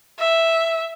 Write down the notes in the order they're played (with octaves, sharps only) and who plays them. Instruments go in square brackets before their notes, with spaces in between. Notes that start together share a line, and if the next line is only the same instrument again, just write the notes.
[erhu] E5